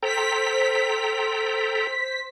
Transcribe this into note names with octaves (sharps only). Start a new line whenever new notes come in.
A4 C5 G5 A#5 B6